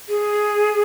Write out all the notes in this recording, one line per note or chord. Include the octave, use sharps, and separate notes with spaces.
G#4